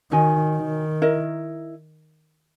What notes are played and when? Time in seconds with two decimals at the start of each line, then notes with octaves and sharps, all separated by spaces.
0.11 D#3 D#4 F#4 C#5 G#5
0.56 D#3
1.02 E4 A#4 D#5